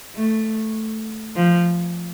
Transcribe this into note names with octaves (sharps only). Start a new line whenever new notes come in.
A3
F3